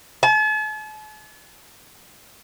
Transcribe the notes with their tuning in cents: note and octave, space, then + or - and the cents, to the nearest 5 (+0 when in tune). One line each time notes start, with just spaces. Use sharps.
A5 -45